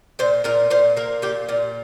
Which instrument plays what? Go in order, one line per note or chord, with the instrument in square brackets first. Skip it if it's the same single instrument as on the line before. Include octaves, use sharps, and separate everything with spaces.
[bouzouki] A#2 C5
A#2 A#4
A#2 C5
A#3 A#4
A#2 G4
A#2 F4